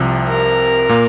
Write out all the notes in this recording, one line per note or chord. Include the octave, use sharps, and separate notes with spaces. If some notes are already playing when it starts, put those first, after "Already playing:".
Already playing: C2 C3 F3
A#4
A#2 A#3